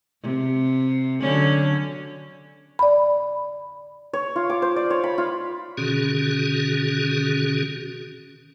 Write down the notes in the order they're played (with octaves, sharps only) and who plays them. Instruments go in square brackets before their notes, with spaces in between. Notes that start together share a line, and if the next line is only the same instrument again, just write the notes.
[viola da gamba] C3
D3 F#3 C#4
[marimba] D5 B5
[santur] C#5
F4
D6
C5
D5
C#5
B5
F4
[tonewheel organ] B2 D3 D#3 C#4 F#4 G#4